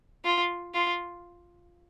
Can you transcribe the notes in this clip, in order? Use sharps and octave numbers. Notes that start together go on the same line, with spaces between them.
F4
F4